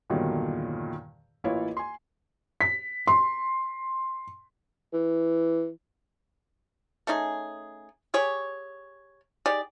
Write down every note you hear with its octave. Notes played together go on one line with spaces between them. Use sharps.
E2 G2 A#2 D3 D#3 F#3
A1 A#3 E4 F4 B4 C#5
G#5 C6
B6
C6
E3
A3 C#4 D#4 G#4
G4 G#4 C#5
D#4 G4 G#4 D5